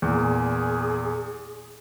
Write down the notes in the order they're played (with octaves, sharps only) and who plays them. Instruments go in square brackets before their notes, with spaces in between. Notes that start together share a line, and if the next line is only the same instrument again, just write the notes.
[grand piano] E2 A#2 [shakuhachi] G#4